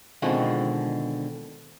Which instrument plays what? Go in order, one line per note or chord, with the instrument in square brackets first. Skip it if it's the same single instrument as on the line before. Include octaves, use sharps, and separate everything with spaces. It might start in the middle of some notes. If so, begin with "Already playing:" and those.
[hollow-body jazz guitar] B2 D3 D#3 G#3 C4 F4